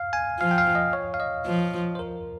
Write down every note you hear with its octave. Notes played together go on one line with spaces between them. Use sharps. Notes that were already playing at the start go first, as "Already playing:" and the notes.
Already playing: F5
G#5
F3 F5
G5
F5
D#5
C#5
F5
D#5
F3
C5
A#4